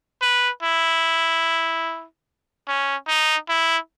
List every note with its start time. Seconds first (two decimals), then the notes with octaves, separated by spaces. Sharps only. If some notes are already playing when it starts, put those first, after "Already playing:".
0.22 B4
0.62 E4
2.68 C#4
3.08 D#4
3.49 E4